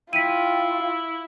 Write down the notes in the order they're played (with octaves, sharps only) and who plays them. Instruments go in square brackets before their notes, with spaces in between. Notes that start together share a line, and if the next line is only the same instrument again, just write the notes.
[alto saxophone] E4 [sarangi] F4 [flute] G5 [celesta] B6 D#7